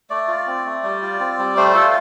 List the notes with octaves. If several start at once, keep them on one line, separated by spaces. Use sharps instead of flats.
A3 D5
F4
C4
A3
G3
F4
C4
G3
A3 C5
F4 A4